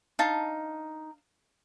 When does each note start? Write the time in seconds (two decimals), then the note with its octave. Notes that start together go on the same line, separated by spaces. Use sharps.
0.19 D4 D#4 F5 A5